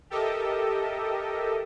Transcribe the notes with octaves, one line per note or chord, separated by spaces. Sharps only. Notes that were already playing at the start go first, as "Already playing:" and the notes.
G4 A4 A#4 D#5 E5